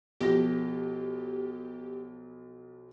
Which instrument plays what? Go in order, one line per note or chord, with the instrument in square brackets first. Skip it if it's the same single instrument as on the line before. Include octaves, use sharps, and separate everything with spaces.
[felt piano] B1 F3 A#6 [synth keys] G4